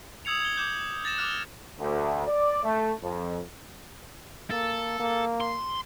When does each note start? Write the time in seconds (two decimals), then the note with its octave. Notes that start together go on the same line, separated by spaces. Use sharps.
0.25 D#6 E6 G#6 C#7 F7
0.41 G#6 C#7 G7
0.56 D6 G6 G#6
1.04 G6 A6 A#6 E7
1.17 D6 D#6 F6 F#6 F7
1.79 D2
2.27 D5
2.63 A3
3.02 F2
4.51 A#3 A4
5.00 A#3
5.41 C6